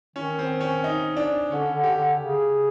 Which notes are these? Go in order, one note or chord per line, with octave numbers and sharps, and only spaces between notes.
D#3 C#4
C4
C#4
D#4
D4
D3 C#4
D3
G4
D3
C#3